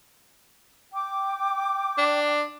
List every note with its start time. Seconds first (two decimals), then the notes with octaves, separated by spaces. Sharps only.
0.92 G5 D6
1.98 D4